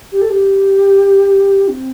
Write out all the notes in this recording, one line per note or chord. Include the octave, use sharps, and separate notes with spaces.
G4
A4
G4
C4